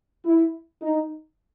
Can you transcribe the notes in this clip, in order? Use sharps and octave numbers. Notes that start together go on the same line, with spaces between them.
E4
D#4